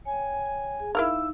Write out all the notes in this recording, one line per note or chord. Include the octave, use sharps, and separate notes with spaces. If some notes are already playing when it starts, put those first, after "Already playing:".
C#5 G5 G#5
G#4
D#4 E4 A#4 F5 E6